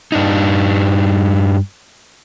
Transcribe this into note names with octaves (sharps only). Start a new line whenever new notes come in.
G2 D4 D#4